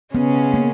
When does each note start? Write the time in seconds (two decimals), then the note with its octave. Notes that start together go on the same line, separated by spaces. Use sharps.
0.15 C#3 G#3 B3 C#4
0.54 A#3